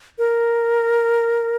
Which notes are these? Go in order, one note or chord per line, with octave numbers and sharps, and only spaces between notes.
A#4